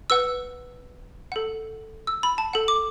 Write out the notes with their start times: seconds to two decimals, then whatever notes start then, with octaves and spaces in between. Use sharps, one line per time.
0.10 B4 F#5 E6
1.32 A4 F#5
2.07 E6
2.23 B5
2.38 A5
2.53 A4 F#5
2.68 D6